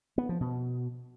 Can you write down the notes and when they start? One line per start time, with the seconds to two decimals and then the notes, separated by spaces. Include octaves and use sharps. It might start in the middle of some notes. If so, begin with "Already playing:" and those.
0.18 B3
0.29 F3
0.41 B2